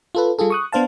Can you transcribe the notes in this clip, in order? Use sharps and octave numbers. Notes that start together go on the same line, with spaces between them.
F4 A4 B4
G3 F4 G#4 A4
C#6 D#6 F#6
B3 D4 C5 F5 A5